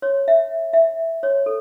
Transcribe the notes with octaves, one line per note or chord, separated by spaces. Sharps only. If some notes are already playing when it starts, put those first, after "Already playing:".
C#5
E5
E5
C#5
A4